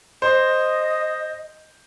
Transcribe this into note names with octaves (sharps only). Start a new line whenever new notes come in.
C5 D#5